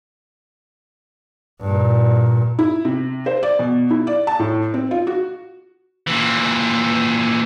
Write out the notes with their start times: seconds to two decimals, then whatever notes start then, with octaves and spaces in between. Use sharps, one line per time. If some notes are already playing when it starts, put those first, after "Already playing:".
1.61 G2 A#2
2.59 E4
2.85 C3
3.26 C5
3.43 D5
3.59 B2
3.90 E4
4.07 D5
4.27 A5
4.40 A2
4.74 C4
4.91 F4
5.07 F#4
6.07 A#2 E3